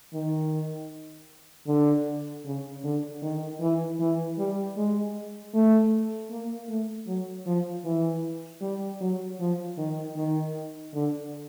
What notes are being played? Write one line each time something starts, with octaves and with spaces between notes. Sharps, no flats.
D#3
D3
C#3
D3
D#3
E3
E3
G3
G#3
A3
A#3
A3
F#3
F3
E3
G3
F#3
F3
D#3
D#3
D3